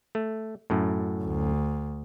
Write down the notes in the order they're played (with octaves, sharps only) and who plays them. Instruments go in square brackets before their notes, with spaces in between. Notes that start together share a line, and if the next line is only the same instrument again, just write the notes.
[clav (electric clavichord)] A3
F#2 A2
[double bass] D2